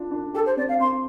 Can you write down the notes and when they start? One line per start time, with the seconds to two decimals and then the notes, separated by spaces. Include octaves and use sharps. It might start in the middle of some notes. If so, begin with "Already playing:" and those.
Already playing: D4 F4
0.11 D4
0.34 G4 A4
0.46 C5
0.57 C4 D5
0.68 F5
0.80 C4 C6